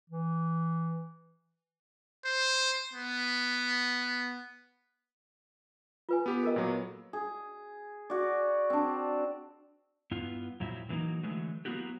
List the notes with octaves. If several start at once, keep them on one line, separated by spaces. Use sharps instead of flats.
E3
C5
B3
F4 B4 G#5
B3 G4
A4 A#4 D#5
A#2 F#3 B3
G#4
F#4 D5
C4 D4
G2 B3 E4 F4
F2 A#2 F#3 G3 E4
D3 E3 F#3 A#3 D#4
D3 E3 F#3 G#3 A3
F#3 A#3 B3 E4 F#4 G4